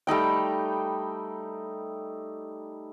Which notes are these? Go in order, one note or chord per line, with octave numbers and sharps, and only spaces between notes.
G3 A3 D#4 G5